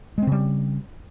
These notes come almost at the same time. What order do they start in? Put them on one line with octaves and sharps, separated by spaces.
G#3 C4 C#3 G3